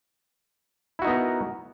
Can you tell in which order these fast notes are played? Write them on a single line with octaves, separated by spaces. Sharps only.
E4 F#4 D#4 B3 A#4